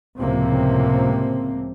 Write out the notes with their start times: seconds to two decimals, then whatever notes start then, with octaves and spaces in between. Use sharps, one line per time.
0.20 C#2 A2 C3 F3 A#3 C4